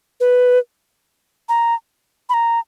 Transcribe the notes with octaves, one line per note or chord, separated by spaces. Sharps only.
B4
A#5
B5
A#5